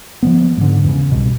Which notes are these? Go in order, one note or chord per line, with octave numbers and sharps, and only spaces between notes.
F3 F#3 B3
G#2 D3
E2 C#3
C2 B2